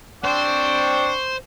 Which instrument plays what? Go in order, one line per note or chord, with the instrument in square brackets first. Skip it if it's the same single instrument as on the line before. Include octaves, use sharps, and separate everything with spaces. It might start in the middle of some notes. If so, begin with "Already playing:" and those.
[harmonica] C4 D4 G5 [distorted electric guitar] C5 [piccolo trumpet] C#6